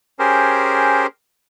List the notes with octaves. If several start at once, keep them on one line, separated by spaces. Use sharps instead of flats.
C#4 G4 G#4 A#4 C5